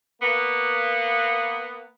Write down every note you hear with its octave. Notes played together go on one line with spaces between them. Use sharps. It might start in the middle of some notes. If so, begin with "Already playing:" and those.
A#3 B3